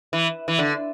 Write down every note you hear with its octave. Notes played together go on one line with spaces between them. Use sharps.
E3
E3
D3